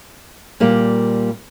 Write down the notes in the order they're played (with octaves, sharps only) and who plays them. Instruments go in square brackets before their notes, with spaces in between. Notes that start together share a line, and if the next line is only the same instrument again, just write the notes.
[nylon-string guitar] A#2 G3 A#3